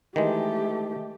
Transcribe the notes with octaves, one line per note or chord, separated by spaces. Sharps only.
D#3 E3 G#3 A3 G4